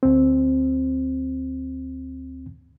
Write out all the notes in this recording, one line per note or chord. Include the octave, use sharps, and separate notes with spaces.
D2 C4